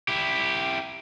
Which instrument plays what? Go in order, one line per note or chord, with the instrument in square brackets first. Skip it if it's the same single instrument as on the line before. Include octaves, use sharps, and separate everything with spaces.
[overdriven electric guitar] E4 G4